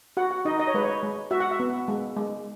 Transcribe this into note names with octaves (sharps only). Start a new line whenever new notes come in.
F#4 F#5
F#5
D#4 D#5
D#5
C#5
G#3 B4
C#5
G#3
F#4 E5
F#5
E5
B3
G#3
G#3